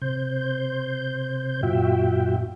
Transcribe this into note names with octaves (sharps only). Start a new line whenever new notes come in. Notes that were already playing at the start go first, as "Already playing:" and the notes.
C3 C5 G6
F#2 A#2 F4 F#4 E5 G5